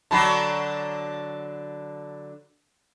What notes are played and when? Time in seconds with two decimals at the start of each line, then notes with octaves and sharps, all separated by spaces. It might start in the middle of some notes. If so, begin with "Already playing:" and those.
0.11 D3 F#3 D4 A5 B5